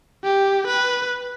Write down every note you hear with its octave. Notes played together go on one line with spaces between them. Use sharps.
G4
B4